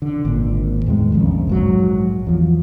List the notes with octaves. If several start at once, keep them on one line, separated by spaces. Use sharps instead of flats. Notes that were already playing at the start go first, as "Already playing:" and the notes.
D3
G#1 A#2
E2 A2 D#3 G#3
A#1 F2 C#3
A#1 G#2 F#3
E2 F3